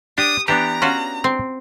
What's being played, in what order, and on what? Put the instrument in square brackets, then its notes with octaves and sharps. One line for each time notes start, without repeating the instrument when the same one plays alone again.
[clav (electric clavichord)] D4 [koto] G4 [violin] D#6
[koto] E3 [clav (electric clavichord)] B3 D4 G4 [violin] A#5
[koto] C#4 F4 F#4
C4